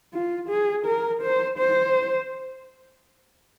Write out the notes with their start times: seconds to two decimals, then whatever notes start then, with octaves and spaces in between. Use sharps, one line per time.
0.14 F4
0.50 G#4
0.86 A#4
1.22 C5
1.59 C5